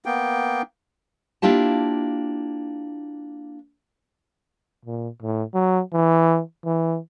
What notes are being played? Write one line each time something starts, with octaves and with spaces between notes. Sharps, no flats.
A#3 B3 G5
A#3 D4 E4 F4 G4 A5
A#2
A2
F#3
E3
E3